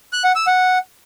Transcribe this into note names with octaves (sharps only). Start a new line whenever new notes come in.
F#6
F#5
E6
F#5